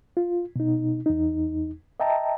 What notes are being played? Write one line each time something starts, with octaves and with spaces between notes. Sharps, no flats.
F4
B2 D#4
E2 D#4
D#5 E5 G5 A5 A#5